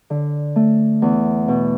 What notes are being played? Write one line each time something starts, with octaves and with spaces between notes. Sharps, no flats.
D3
A3
E2
B2